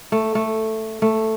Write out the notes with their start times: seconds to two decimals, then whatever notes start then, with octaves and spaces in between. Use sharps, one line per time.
0.12 A3
0.35 A3
1.02 A3